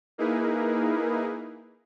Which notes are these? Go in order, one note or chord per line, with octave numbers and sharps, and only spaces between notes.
A#3 D#4 E4 G#4 A#4 B4